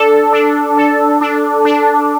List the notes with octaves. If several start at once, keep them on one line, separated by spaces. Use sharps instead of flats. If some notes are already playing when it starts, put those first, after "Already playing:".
Already playing: D4 A4
D4
A4
D4
D4